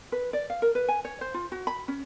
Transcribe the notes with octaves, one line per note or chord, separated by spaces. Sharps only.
B4
D5
F5
A#4
B4
G#5
C#5
C5
F4
F#4
B5
C#4